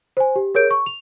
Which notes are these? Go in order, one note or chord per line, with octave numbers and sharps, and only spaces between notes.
C5 G#5
G4
G#4 A#4 C#5 G6 D7
C#6
F7